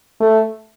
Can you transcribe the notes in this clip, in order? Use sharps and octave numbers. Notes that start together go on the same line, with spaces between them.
A3